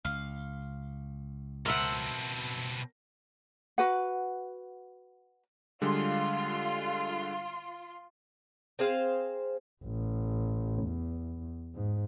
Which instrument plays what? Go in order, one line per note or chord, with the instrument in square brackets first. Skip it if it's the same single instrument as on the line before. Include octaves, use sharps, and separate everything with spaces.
[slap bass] C#2 [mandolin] F5
[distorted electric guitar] B2 C4 [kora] A#4 E5 F#5 [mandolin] A5 C6
[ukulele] F#4 B4 F#5
[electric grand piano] D3 G3 G#3 [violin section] F4 C6
[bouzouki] C4 G#4 C5 F5
[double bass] A1
E2
G#2